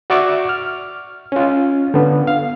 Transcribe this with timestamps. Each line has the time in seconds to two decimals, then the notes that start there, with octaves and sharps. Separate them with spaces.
0.10 F#4 D5 E5 C#6 D6
0.49 F6
1.32 C#4 F4
1.94 D3 B3
2.27 F5